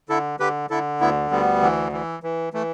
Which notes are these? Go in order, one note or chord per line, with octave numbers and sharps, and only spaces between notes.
D3 E4 A4
D3 G4 B4
D3 E4 A4
D2 B3 E4
D2 G3 B3
E3
E3
E3
E3 A3